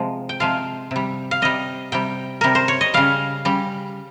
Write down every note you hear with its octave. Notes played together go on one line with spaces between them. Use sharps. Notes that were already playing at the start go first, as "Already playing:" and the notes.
Already playing: C3 F3 G#3
G5
C3 F3 G#3 F5
C3 G3
F5
C3 G3 D#5
C3 G3 G5
C3 G3 A#4
C5
C#5
D#5
C#3 G3 F5
C#3 G3